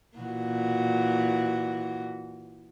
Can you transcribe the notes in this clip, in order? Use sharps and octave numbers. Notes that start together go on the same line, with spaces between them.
A#2 E3 F#4